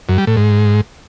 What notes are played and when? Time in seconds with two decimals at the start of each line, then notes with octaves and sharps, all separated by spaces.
0.09 F#2
0.18 G3
0.27 A2
0.37 G#2